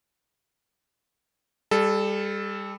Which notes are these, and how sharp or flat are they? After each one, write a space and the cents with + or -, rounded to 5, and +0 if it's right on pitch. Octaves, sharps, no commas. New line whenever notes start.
G3 +25 A4 -15